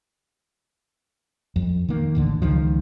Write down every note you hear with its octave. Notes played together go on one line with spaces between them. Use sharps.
F2
D#3 A#3
A1 D#2 D3
C#2 D#3 F3